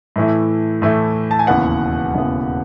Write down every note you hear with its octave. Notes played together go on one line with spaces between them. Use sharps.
A2 E3 A3 E4
A2 E3 A3 E4
A5
G#5
E1 D#2 C#3 E3 B3 F#5
E1 D#2 C#3 E3 B3